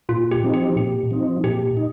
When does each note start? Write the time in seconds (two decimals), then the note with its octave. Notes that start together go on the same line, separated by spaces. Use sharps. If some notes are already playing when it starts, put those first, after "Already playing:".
0.09 A#2 F4
0.31 G4
0.43 F3 C4 D#4
0.54 G4
0.76 A#2 G4
1.11 F3 C4 D#4
1.44 A#2 G4
1.77 D#4